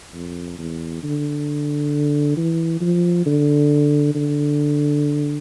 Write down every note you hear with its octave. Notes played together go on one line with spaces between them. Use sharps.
F2
E2
D3
E3
F3
D3
D3